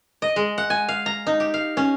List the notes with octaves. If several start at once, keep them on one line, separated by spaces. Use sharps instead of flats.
D#5
G#3
F#5
G#5
F5
A#5
D#4
G4
F5
C#4